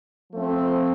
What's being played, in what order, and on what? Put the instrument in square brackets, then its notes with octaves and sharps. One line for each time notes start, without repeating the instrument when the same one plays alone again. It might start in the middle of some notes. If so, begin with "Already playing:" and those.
[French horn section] F3 A3 C4